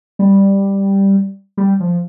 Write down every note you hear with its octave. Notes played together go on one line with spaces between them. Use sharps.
G3
G3
F3